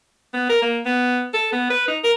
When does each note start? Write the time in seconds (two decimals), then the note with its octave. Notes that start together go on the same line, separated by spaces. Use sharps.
0.33 B3
0.49 A#4
0.62 A#3
0.85 B3
1.34 A4
1.52 B3
1.70 B4
1.88 D#4
2.04 A#4